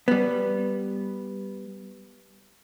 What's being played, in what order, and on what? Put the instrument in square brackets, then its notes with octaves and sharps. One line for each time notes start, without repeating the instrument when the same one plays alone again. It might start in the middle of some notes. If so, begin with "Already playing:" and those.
[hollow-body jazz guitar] G3 B3